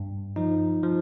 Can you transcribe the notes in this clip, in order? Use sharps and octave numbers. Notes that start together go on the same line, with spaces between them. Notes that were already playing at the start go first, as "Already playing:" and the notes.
Already playing: G2
F3 D#4
F3